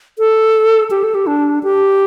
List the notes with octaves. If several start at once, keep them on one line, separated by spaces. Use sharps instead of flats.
A4
G4
A4
G4
D4
G4